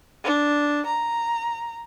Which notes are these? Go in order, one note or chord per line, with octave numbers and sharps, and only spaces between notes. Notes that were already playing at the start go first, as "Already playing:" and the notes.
D4
A#5